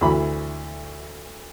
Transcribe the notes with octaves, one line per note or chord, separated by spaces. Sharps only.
D2 E3 B5